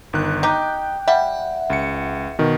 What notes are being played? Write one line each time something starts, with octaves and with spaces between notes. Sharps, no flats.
G1 D#3 F#6
D#4 G4 G5
G3 E5 F#5
C#2 C#7
B2 D#3